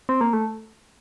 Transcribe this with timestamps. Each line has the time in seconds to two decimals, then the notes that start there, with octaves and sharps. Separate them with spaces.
0.09 C4
0.21 A#3
0.33 A3